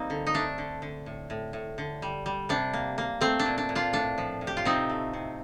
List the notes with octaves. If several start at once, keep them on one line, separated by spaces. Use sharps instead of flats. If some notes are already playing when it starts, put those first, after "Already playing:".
Already playing: G3 A#3 C4 D#4
D3
D#4
A3 D4
D3
D3
A2
A2
A2
D3
G3
G3
C3 D4
A#3
A#3
A3 C4
D4
A#2
D4
A#2
D4 F4
A2 D4
F3
A2
G4
F4
C3 C4 D#4
A3
C3